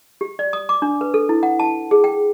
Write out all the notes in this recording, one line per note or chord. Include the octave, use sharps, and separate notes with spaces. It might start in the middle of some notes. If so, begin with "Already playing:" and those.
G4
D5
D#6
D6
D4
B4
A4
E4
F#5
A5
G#4
G5